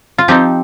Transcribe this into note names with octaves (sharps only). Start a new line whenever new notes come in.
F4
F3 C4 D#4 G4